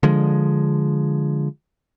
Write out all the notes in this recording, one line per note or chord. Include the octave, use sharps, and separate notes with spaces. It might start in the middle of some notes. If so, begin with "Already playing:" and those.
D3 F3 G#3